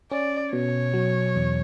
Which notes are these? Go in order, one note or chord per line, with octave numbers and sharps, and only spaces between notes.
C#4 D5
B2 C#5
F#3
E2